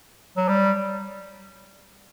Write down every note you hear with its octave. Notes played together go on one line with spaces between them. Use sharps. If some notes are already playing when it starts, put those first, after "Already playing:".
F#3
G3